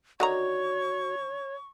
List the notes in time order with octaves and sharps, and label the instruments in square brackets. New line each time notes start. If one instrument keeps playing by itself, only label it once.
[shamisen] D3 D#3 A#5 [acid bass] F#4 [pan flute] C#5 [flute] C#6